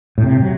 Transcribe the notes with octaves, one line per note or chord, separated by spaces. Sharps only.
A2
C3
F#3